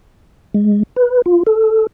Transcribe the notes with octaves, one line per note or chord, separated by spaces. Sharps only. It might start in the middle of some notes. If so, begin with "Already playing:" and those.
G#3
B4
F4
A4